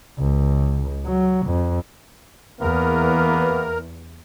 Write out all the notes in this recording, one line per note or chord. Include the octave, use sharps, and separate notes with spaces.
C#2
F#3
F2
E2 E3 A#3 B3 A#4